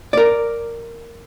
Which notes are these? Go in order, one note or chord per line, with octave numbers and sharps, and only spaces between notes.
A#4 D5